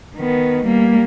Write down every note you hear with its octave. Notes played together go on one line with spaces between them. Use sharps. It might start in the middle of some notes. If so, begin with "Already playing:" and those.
D#3 B3
G3 A#3